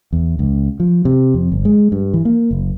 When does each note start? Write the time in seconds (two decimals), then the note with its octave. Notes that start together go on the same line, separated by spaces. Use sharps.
0.13 E2
0.39 C#2
0.80 F3
1.05 C3
1.34 F2
1.52 G1
1.65 G#3
1.92 G2
2.14 E3
2.25 A#3
2.51 F#1